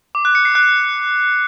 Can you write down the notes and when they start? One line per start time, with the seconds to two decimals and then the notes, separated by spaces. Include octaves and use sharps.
0.15 D6
0.25 F#6
0.35 C#7
0.45 C7
0.55 F#6